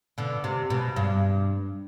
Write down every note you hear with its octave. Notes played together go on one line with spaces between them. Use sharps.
B2 D3
C3
B2
G2